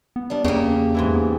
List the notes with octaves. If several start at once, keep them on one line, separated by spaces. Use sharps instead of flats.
B3
G3 D4
E2 C#3 A#3 G4
G#2 E3 E4
B3